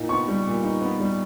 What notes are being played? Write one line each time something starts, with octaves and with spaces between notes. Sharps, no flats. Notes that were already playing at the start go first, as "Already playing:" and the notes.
Already playing: A#2 D#4
B3 C#6
G3
A#2
D#4
B3
G3